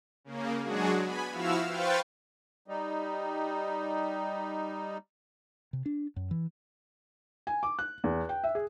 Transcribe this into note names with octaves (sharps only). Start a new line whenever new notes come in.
C#3 A#3
F#3 G#3 D4 F#4 G#4
B3 G#5 B5
F3 E4 F#4 F5 E6 F6
B4 C5 F5 G5 C#6 A6
G3 D#4
C3
D4
F#2
E3
G#5
D6
F#6
E2
G5
E5
G#4